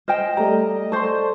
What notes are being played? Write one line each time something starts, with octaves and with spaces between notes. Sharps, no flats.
C5 D#5 G5 F6 E7
G3 A3 G4 A4 D5 A#5
A4 C5 D5 A5 C6 C#6